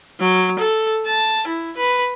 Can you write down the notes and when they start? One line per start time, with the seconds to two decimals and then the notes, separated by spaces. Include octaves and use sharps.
0.20 F#3
0.59 A4
1.06 A5
1.47 E4
1.77 B4